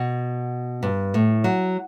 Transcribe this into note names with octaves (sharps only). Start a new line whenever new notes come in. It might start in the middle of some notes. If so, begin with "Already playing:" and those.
Already playing: B2
G2
A2
F#3